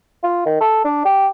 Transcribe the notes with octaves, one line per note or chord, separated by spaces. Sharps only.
F4
D#3
A4
D4
G4